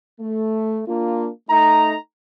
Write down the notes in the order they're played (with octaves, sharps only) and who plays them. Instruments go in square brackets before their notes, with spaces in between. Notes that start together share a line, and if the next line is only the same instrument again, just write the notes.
[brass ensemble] A3
A#3 D4 F4
A3 D#4 A#5